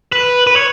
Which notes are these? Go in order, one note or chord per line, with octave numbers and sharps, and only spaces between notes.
B4
B4
C#5